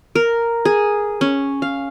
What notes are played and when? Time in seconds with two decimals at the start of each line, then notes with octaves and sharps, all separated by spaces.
0.15 A#4
0.65 G#4
1.21 C#4
1.62 F5